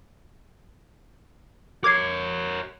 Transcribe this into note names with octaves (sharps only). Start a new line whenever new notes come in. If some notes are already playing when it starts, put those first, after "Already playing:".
A#4 C#5 D6 G#6 C7